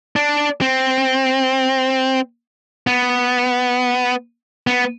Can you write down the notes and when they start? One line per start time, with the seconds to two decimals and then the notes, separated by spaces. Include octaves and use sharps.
0.16 D4
0.61 C4
2.87 B3
4.67 B3